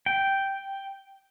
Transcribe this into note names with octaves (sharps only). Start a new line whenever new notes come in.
G5